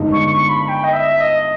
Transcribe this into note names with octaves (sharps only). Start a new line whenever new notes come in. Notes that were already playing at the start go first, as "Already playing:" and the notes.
Already playing: G1 G2 D#3 G#3 D#4
C#6
C#6
B5
G5
D#5
E5
D#5